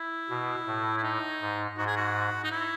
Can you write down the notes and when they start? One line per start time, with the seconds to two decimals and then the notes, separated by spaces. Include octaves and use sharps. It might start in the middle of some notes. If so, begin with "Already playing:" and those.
Already playing: E4
0.30 B2
0.66 A2
0.97 E4
1.03 D#4
1.41 G#2
1.78 G#2 F#4
1.87 G#4
1.96 F#4
2.44 D#4
2.51 E4